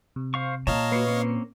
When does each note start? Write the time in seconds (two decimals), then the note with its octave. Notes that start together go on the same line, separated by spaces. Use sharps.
0.16 C3
0.34 C5 F5 C#6
0.67 A#2 C#5 D#5 F5 A5 A#5
0.92 A#3 F#4 B4 C7 C#7
1.07 A#3 C4 C#4